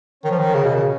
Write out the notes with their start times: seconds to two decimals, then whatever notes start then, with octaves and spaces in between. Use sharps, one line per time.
0.23 D#3 C#4
0.31 F3
0.38 D#3
0.55 C#3
0.65 B2
0.75 C#3